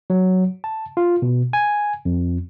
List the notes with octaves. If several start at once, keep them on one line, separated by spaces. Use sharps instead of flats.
F#3
A5
F4
B2
G#5
F2